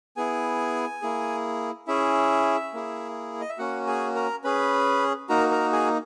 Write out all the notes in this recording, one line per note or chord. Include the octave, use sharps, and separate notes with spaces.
B3 E4 G#4 G#5
A#3 E4 G#4
C#4 E4 G#4 E5
A#3 E4 G#4
D#5
E5
A#3 C#4 F#4 F#5
G#4 G#5
A#4 A#5
C#4 G#4 B4 B5
A#3 D#4 F#4 A#4 A#5
A#4 A#5
G#4 G#5